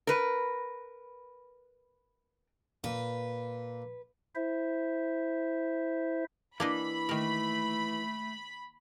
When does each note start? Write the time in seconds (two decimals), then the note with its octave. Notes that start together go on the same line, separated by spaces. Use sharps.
0.07 A#4 B4
2.84 A#2 B4
4.35 E4 C5 E5
6.60 E3 A#3 D4 D#5 B5
7.09 D#3 A3 A#4